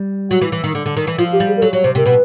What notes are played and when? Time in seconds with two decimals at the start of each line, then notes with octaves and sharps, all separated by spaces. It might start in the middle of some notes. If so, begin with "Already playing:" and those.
Already playing: G3
0.31 F#3 F#4
0.41 E3
0.52 E3
0.64 D#3
0.75 D3
0.86 D3
0.97 D#3
1.07 E3
1.18 F3 F4
1.33 G4
1.40 G3
1.48 G#4
1.57 A#4
1.62 F#3 A4
1.73 F#3 C#5
1.84 C3 C5
1.95 C3 A#4
2.06 B2 B4